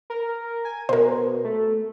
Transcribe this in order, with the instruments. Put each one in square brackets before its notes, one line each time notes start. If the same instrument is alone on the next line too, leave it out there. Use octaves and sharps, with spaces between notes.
[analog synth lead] A#4
G#5
[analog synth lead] B2 [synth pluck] A#4 C5
[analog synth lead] A3